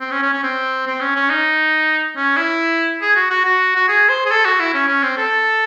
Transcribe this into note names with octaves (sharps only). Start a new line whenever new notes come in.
C4
C#4
C#4
C#4
C4
C4
C#4
C#4
D#4
C#4
E4
G#4
F#4
F#4
F#4
F#4
G#4
C5
G#4
A4
F#4
E4
C#4
C#4
C4
A4